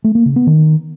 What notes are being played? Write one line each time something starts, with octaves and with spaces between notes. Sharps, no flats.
A3
A#3
C#3
B3
D#3